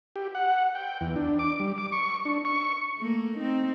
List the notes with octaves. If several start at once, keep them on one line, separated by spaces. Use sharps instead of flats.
G4
F#5
G5
E2
D4
D6
G3
D6
C#6
D4
C#6
A3 A#3
C4 D#4